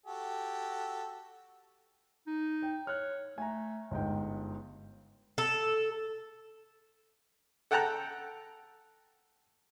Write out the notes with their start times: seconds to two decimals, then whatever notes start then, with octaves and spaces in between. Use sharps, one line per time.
0.06 F#4 G4 A4
2.27 D#4
2.62 G5
2.87 C#5 F6 F#6
3.38 A3 G#5 A#5
3.91 G1 G#2 G#3 G5
5.38 A4
7.71 A4 F#5 G5 A5 A#5 F#6